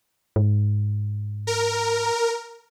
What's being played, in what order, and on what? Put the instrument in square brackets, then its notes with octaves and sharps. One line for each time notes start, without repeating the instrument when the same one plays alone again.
[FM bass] G#2
[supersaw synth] A#4